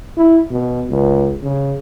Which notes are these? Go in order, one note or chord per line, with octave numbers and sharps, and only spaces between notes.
E4
B2
C#2
C#3